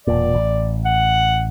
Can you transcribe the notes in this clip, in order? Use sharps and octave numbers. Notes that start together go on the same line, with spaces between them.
E1 A#2 D5
A1
F#5